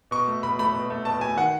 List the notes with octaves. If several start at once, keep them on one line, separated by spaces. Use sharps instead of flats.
B2 C#6
A3
B2 B5
A3 B5
B2
A3
B2 A5
A3 G#5
D#3 F#5